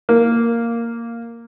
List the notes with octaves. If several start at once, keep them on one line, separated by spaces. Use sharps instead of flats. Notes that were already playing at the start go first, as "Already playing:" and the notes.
A#3